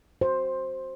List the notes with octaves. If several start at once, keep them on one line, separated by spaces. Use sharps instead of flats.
F#4 C5